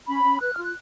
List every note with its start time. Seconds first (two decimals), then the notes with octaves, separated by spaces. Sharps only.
0.08 C#4 B5
0.24 C#4
0.41 B4 F#6
0.52 F4 F6
0.62 F#6